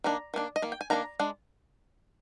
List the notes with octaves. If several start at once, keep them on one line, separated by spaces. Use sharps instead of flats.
D#3 A#3 D4 A#5
D#3 A#3 D4
D#5
D#3 A#3
G5
G#5
D#3 A#3 D4 A#5
G#3 D4